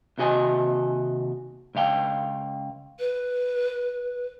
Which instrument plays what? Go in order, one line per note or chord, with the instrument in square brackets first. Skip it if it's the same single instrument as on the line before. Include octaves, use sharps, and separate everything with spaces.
[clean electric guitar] D#2 C3 F#4 D#5 G#5
C#2 C#3 F5 G5
[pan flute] B4